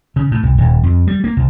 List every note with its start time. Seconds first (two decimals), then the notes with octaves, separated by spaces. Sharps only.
0.16 C#3
0.31 A2
0.43 C2
0.58 D#1
0.83 F2
1.07 G3
1.24 A#3
1.37 C2